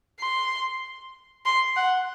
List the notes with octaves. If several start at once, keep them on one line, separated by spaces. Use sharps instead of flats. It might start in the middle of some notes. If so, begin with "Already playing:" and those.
C6
C6
F#5